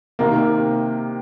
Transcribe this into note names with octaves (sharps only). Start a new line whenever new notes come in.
C3 D#3 A#3